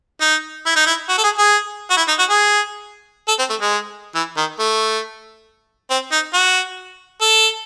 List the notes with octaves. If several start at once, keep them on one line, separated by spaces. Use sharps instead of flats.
D#4
E4
D#4
E4
F#4
A4
G#4
G#4
F#4
E4
D#4
F#4
G#4
A4
C4
A3
G#3
E3
D#3
A3
C4
D#4
F#4
A4